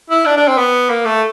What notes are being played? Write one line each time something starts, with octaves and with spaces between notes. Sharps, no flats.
E4
D4
D4
C4
B3
A#3
A3